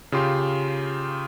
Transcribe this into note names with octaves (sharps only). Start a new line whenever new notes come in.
C#3 F4 G4 C6